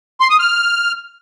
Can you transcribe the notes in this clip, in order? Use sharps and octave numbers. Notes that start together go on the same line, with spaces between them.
C6
D#6
F6